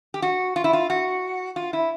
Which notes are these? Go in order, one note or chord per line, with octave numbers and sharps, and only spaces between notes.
G4
F#4
F4
E4
F4
F#4
F4
E4